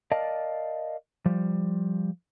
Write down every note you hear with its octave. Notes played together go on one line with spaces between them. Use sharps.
A#4 D5 D#5 F5 A5
F3 G3